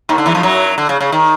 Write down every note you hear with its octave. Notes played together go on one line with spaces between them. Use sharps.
D#2 D#3
D3
E2 E3
F2 F3
F#2 F#3
D3
C#3
C#3
D#3